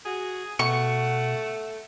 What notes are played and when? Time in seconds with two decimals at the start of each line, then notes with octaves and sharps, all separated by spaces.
0.05 F#4 G#4
0.59 B2 A3 F#5 C#6